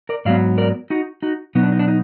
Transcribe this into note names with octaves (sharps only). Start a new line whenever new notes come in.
A#4 D5
G#2 F#3 B3 D5 F5
A#4 D5
D#4 F#4
D#4 F#4
B2 F#3 B3 D#4
D4
D#4
D4
D#4